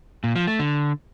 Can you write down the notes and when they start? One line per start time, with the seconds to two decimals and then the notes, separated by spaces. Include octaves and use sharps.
0.24 A#2
0.36 F3
0.47 A3
0.59 D3